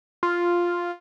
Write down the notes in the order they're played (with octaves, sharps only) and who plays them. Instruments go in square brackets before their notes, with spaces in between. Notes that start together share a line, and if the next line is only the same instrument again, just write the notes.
[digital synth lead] F4